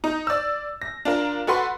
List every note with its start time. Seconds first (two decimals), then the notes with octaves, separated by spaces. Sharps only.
0.04 D#4
0.27 D5 E6
0.82 A#6
1.05 D4 F4 A#4
1.47 F#4 A4 B4 F#5 C6